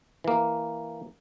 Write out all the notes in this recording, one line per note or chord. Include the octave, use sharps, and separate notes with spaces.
E3 A#3